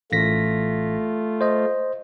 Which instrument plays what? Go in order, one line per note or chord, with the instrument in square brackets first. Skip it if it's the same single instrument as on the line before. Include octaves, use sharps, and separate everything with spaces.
[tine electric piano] A1 A#6 B6 [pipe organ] A3 F4
[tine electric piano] C5 D#5